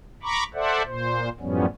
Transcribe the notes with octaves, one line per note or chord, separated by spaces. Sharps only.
A#5 B5 C#6 D6
A4 C5 D5 E5 F#5
A#2 C5
F#2 A2 F3 G3 B3 C#4